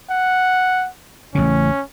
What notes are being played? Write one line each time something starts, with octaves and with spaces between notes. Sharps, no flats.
F#5
A1 C#3 C#4